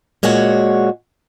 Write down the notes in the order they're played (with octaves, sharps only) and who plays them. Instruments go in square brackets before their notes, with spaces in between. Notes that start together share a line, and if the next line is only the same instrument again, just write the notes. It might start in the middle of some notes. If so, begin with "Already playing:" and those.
[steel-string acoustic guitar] A#2 G#3 F#4 C#5 F#5